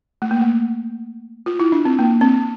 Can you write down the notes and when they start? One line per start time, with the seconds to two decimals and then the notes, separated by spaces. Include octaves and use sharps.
0.22 A3
0.31 A#3
0.41 A3
1.46 F4
1.60 E4
1.72 D4
1.85 C4
1.99 A#3
2.21 C4